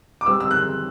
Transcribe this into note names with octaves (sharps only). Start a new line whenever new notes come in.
D6
G3 C4 G4 B4 E6
E6
F#6